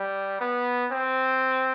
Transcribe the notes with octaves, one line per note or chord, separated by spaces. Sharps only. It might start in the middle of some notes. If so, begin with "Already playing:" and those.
Already playing: G3
B3
C4